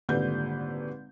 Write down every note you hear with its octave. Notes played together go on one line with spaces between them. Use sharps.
G#1 A#2 D3 G3 B4 G6